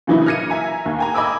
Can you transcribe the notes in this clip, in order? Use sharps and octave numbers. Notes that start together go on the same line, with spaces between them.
A#2 C#3 E3 F#3 D#4 E4
F6 G#6 A#6 C#7 D#7
E5 G#5 A#5
D#2
G5 G#5 A#5
D#5 G#5 B5 D6 E6